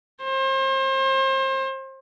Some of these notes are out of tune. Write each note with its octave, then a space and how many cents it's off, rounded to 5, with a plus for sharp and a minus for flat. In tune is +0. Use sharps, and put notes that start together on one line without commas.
C5 +35